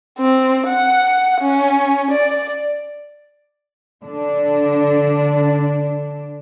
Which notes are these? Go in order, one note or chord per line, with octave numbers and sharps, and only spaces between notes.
C4
F#5
C#4
D5
D3 D4